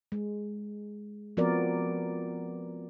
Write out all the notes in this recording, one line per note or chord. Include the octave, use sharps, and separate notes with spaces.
G#3
F3 B3 C4 F#4 A#4 D5